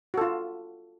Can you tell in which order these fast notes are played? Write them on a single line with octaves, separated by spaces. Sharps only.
F#4 A4 F4